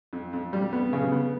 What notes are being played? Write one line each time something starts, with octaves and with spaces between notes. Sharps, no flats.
F2
F2
G3
B3
C#3
B3